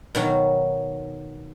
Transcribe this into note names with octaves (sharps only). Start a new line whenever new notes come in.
B2 D#3 F#3